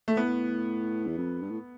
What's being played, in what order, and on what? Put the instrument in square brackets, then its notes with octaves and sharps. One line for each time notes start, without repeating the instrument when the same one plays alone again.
[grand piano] A3
[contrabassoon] A2 [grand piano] B3
[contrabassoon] E2
F2
G2
A2